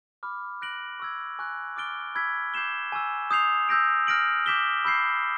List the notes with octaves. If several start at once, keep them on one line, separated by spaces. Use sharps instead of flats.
B5 D6 F6
F#6 A#6 D7 F#7
C#6 E6 G#6
G#5 C#6 F#6
D6 F6 A6 D7 G7
B5 E6 G#6 B6
D6 G6 C7 E7 G7
G#5 C#6 E6
D#6 G6 C7 F7
E6 G6 A#6 D7
F6 A#6 D7 F#7
D6 G6 B6 E7 G7
B5 E6 G6 C7